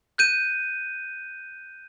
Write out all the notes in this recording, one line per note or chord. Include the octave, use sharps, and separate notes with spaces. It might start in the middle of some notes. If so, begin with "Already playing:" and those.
F#6 G6 D#7